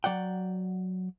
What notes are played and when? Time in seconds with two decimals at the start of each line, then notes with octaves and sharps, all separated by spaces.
0.04 F#3 D5 F#5 G5